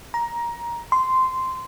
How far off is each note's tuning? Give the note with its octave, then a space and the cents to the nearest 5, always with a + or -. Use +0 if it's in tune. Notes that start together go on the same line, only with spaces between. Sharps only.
A#5 +15
C6 -10